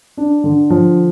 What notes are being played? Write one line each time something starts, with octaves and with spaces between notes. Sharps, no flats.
D4
D3
F3